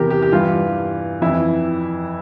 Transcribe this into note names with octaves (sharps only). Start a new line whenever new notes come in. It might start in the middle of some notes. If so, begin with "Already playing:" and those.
Already playing: E2 C3 E3 G4 A#4
G4
G4
G2 E3 F4
F2 E3 E4